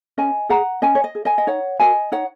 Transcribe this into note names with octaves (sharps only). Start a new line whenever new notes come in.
C#4 D#5 G#5
G#4 F#5 A#5
C#4 D#5 G#5
C#5
D#5
G#4
D#5 G#5
D#5
D#4 C#5 F#5
F#4 A#4 D#5 G#5
D#4 C#5 F#5